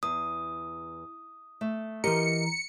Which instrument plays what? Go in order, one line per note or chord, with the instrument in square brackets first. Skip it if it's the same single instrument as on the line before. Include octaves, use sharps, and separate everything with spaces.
[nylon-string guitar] E2 [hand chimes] D#6
[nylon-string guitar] A3
[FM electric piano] E3 A#5 [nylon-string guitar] G4 A#4 D#5 [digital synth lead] C#7